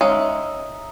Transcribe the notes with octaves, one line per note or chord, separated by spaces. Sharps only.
G#3 C#4 D#4 E5 F5